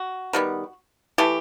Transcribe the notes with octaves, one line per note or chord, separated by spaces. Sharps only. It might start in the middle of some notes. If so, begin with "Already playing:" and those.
Already playing: F#4
D#3 G3 B3
E3 A3 G4